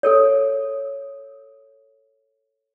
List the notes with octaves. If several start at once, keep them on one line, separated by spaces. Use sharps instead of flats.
A4 A#4 C#5